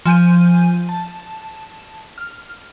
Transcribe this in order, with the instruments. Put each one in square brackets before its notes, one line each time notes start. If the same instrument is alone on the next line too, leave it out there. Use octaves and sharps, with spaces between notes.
[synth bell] F3 G#5 G6 D#7
A5
F6